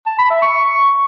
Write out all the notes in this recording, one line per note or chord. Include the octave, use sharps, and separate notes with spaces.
A5
B5
E5
C#6